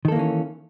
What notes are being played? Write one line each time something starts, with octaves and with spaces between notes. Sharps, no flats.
D#3 E3 A#3 C#4 A4